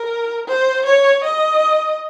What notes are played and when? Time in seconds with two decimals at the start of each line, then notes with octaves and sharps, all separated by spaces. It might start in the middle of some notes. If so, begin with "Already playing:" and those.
Already playing: A#4
0.47 C5
0.86 C#5
1.24 D#5